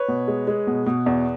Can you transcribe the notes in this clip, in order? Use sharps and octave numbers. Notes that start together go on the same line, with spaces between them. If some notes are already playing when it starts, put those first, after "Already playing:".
Already playing: B4 C#5
B2
G#3
G#3
B2
B2
E2